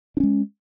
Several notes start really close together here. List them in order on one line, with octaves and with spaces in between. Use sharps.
D4 C#4 G#3